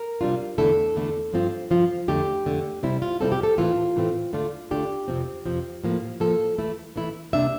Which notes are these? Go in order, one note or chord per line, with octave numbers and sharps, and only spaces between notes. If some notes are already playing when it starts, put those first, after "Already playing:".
Already playing: A#4
C3 G3 D4 F4
E2 D3 A3 E4 A4
E2 D3 A3 E4
G2 F3 C4 F4
G2 F3 C4 F4
F2 D3 A3 G4
F2 D3 A3
C3 G3 C4 E4
F4
C3 G3 C4 E4 A4
G4
A4
A2 E3 A3 C4 F4
A2 E3 A3 C4
D3 A3 D4 F4
D3 A3 D4 F4 G4
F2 C3 F3 C4
F2 C3 F3 C4
A2 F3 A#3
A2 F3 A#3 A4
E3 A3 E4
E3 A3 E4
C3 G3 A#3 D4 E5